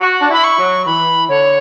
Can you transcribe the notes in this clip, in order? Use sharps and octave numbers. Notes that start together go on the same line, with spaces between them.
F#4
D4
E4 B5
C#6
F#3
E3 B5
D3 C#5